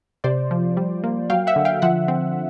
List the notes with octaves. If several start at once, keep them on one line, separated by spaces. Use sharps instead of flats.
C3 C5 D5
F3
G3
A#3
F#3 F5 G5
E5 F#5
D3
F5 G5
F3 E5 F#5
C4